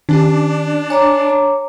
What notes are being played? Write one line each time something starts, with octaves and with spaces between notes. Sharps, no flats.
D#3 C#4 D4 G4
C#5 G#5 A#5 D6